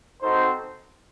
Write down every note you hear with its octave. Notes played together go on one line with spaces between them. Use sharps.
C4 D#4 F#4 A4 C5